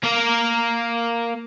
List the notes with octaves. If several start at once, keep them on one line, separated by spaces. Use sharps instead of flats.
A#3 A#4